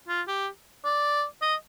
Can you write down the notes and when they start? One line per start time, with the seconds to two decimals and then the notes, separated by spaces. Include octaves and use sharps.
0.09 F4
0.28 G4
0.85 D5
1.42 D#5